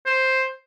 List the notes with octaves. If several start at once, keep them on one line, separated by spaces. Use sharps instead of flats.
C5